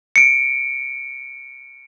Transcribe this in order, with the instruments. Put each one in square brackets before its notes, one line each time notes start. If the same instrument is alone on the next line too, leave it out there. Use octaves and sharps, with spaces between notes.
[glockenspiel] C#7 D7